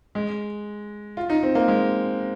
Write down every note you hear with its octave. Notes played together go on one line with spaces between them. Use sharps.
G#3
F4
D#4
C4
A#3
G#3